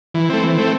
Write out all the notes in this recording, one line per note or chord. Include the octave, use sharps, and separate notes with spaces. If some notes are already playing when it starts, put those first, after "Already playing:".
E3
A3 C4
E3
A3 C4